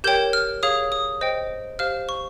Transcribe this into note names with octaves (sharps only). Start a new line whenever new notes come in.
G4 A#4 C#5 G5 G6
F6
G#4 C#5 F5 D#6
D#6
C5 D#5 G5
G4 C5 F5 F6
C#6